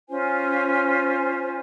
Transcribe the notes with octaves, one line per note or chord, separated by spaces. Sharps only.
C#4 F4 C5 G#5